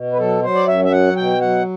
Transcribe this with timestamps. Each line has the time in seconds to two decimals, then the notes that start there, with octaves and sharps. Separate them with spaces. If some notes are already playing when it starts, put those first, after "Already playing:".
Already playing: B2
0.12 B4
0.18 F#3 A4
0.42 F#3 C5
0.55 D5
0.67 F#2 E5
0.84 E5
0.91 F#3 F#5
1.16 B2 G5
1.41 F#3 F#5